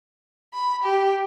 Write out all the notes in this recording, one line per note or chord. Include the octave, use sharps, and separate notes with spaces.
B5
G4